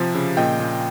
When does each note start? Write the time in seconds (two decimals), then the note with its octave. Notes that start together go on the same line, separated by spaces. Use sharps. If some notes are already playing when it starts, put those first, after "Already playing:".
Already playing: C3 F3
0.15 C#3
0.37 A#2 D#5 G5
0.60 A#2